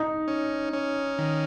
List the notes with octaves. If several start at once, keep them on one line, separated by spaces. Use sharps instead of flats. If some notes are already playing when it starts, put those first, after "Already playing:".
Already playing: D#4
C#4
C#4
D#3